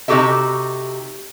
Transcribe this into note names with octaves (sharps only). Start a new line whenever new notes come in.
C3 D#4 F#4 G4 A4 E5